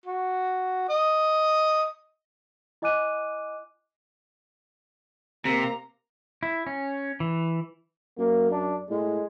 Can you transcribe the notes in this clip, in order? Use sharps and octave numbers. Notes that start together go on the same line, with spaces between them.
F#4
D#5
E4 D#5 G#5 D6 F#6 D#7
C3 A#3 A#5
E4
C#4
E3
F#2 A#3
D4
A2 G#3